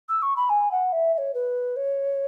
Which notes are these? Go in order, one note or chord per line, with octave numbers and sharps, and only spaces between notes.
E6
C#6
B5
G#5
F#5
E5
E5
C#5
B4
C#5